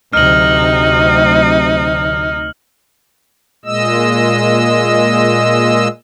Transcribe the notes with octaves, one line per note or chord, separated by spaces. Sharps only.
D2 C3 F#3 D#4 F6 F#7
A#2 G#3 D#5 E6